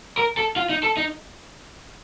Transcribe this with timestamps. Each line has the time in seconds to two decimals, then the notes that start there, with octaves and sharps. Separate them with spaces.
0.18 A#4
0.37 A4
0.56 F4
0.70 D#4
0.83 A4
0.97 D#4